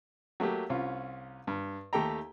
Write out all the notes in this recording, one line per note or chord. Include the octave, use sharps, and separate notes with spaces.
F#3 A3 A#3 G4
C2 C#4 F4
G2
D#2 A3 G4 A4 G5 A#5